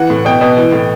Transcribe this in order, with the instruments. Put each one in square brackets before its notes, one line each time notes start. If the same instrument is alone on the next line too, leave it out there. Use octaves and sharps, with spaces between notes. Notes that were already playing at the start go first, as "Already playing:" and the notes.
Already playing: [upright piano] E3 F#5
A2
B2 G5
B2
E3
A2